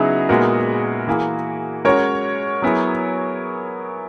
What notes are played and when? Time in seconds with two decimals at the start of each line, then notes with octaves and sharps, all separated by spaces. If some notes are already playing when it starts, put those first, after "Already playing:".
Already playing: C#3 F#3 B3 D#4 E4 F#4 G#4
0.29 A#2 G#3 B3 F#4 A#4
1.07 E3 A#3 E4 G#4
1.85 G#3 C#4 F#4 A#4 C#5
2.62 F#3 B3 E4 G#4